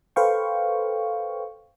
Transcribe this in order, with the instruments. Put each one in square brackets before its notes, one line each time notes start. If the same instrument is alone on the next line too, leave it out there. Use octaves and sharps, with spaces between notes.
[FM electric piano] A4 B4 C5 F5 G5 C#6